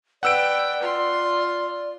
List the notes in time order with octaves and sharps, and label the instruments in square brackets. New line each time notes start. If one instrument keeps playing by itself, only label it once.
[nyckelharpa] B4 G5 [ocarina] D5 [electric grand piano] F#5 E6 D7
[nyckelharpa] F4 C6